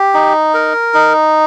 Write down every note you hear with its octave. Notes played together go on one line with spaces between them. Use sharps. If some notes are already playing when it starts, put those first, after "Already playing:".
Already playing: G4
D#4
A#4
D#4